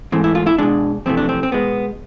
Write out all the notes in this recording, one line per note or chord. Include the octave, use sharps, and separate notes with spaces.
G#2 E3 A3 C4
E4
F4
E4
B2 G#3 D4
F2 C3 E3 A3 C4
D4
C4
C4
B2 G#3 B3